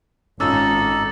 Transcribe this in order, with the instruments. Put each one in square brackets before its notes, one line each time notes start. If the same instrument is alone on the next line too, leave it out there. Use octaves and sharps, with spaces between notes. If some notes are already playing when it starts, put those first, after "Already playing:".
[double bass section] G#1 [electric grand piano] C#4 F4 [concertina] D#4 A4 [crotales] D6 E6 A6